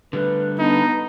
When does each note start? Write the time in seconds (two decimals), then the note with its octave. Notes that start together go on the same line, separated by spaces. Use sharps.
0.13 D3 G3 A3 B4
0.58 B3 D4 D#4